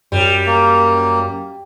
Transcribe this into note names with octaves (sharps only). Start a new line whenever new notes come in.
F#2 G3
A#3